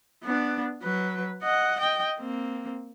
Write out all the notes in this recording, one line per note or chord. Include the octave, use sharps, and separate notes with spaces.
B3 D4
F#3 B4
D#5 F#5
D#5 G5
A#3 C4